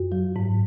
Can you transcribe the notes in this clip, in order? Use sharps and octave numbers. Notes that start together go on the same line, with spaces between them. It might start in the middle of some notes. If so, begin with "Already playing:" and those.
Already playing: F#2 F#4
F#3
G#2